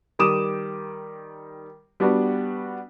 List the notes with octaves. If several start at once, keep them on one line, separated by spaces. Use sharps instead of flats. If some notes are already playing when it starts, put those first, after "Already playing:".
D#3 G3 D6 D#6 E7
G3 B3 D4 F#4